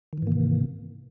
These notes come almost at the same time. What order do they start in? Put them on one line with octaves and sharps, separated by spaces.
D#3 E3 G#2 A#3 C3